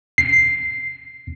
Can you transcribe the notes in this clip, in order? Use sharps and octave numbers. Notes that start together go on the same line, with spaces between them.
C7